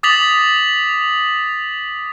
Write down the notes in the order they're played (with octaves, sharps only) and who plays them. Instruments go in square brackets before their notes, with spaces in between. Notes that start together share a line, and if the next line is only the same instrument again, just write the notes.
[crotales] D6 D#6 A6 B6 F7 F#7